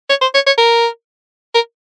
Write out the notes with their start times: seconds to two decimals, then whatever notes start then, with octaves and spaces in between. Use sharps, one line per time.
0.09 C#5
0.22 C5
0.35 C#5
0.47 C#5
0.58 A#4
1.55 A#4